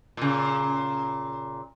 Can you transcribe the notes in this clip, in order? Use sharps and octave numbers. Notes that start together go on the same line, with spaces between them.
A#2 C#3